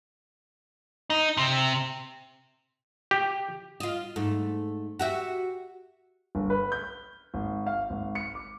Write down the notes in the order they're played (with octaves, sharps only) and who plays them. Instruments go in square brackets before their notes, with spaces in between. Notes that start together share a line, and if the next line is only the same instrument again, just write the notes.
[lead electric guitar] D#4
C3
[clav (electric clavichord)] G4
[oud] F4 D#5
G#2 A3
F#4 G4 E5
[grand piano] G1
B4
G6
G#1
F5
G#1
C#7
D6